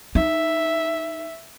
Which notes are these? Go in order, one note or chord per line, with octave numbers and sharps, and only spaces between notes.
D#4 E5